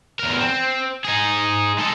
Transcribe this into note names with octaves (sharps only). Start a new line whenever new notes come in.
E2 A#4
C4
D#4 G#4
G#3 A4